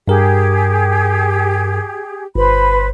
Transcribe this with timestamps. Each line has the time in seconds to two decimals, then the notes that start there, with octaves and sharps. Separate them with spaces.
0.08 G2 G4 G#4 A#4
2.35 G1 B4 C5 B5